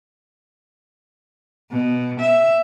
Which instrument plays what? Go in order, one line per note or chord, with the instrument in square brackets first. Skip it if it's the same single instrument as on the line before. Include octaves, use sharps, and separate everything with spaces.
[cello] B2
E5